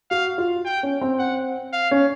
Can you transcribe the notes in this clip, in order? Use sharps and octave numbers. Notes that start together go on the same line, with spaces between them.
F#4 F5
F4
G5
C#4
C4
F#5
F5
C#4